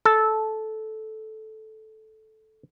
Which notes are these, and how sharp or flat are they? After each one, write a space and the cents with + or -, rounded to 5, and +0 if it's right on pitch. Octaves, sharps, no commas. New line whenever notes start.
A4 -10